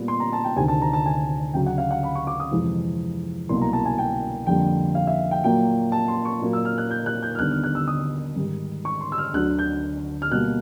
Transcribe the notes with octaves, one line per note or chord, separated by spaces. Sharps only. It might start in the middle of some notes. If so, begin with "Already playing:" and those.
Already playing: A#2 G3 B3
C6
A#5
A5
G5
D2 C3 D#3 G#5
A5
A#5
A5
G#5
D2 C#3 F#3 G5
F#5
F5
F#5
B5
C#6
D6
D#6
F2 C3 E3 G#3
C2 B2 F#3 A#3 C6
A#5
A5
G#5
G5
F2 D3 G3 A#3 G5
F5
E5
G5
A#2 F#3 A#3 G5
A5
C6
C#6
A#2 F#3 A#3
E6
F6
F#6
G6
F#6
G6
F6
D#2 D3 G3 B3 F#6
F6
F#6
E6
D#6
G#2 D#3 G3
C#6
C6
E6
F6
D2 D3 F#3 F#6
G6
F6
B2 G3 A#3 F#6